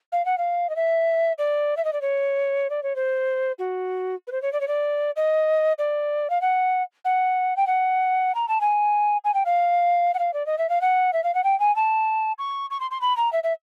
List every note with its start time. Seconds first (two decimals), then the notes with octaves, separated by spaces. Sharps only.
0.12 F5
0.26 F#5
0.38 F5
0.70 D#5
0.76 E5
1.38 D5
1.77 E5
1.85 D#5
1.93 D5
2.01 C#5
2.70 D5
2.83 C#5
2.96 C5
3.59 F#4
4.27 B4
4.32 C5
4.42 C#5
4.53 D5
4.61 C#5
4.68 D5
5.16 D#5
5.79 D5
6.30 F5
6.41 F#5
7.05 F#5
7.56 G5
7.67 F#5
8.35 A#5
8.48 A5
8.61 G#5
9.24 G#5
9.34 G5
9.46 F5
10.14 F#5
10.19 F5
10.34 D5
10.46 D#5
10.58 E5
10.69 F5
10.81 F#5
11.13 E5
11.24 F5
11.35 F#5
11.44 G5
11.60 G#5
11.76 A5
12.39 C#6
12.70 C#6
12.80 C6
12.91 C6
13.01 B5
13.17 A#5
13.33 E5
13.44 E5